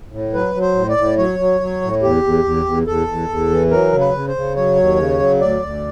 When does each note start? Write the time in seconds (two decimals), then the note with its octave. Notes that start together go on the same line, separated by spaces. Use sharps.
0.12 A2
0.33 F#3 B4
0.55 F#3
0.61 C5
0.75 A2
0.89 D5
0.97 A2
1.18 F#3 C#5
1.39 F#3
1.61 F#3
1.82 A2
2.03 E2 G4
2.23 E2
2.44 E2
2.65 E2
2.87 E2 A4
3.07 E2
3.29 E2
3.50 E3
3.71 F#3 A#4
3.93 C#3
4.00 B4
4.14 C#3
4.28 C5
4.36 C#3
4.56 F#3 C#5
4.77 D#2
4.98 C#3
5.20 F#3
5.41 D2 D5
5.62 D2